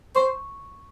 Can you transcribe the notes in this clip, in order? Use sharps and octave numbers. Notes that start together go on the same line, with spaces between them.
C5 C#6